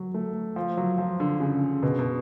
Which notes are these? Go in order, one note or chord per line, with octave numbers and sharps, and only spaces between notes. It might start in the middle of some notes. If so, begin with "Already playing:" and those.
Already playing: F#3
A3
F3
F#3
F3
D3
C#3
B2
B2